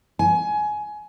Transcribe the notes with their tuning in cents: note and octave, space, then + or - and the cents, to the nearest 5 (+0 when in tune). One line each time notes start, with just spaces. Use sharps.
G#5 +20